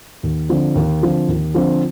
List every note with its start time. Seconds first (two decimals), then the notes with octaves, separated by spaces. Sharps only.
0.23 D#2
0.49 D3 F3 C4
0.75 D#2
1.01 D3 F3 C4
1.28 D#2
1.54 D3 F3 C4